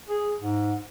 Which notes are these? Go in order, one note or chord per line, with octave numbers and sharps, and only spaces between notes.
G#4
G#2